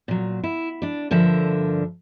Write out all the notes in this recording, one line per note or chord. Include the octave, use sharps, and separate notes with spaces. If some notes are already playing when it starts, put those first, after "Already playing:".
A#2 F#3
E4
D4 D5
G2 D3 F3 A#4 E5